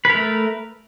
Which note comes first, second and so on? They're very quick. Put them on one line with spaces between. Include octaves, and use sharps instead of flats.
B4 A#4 A3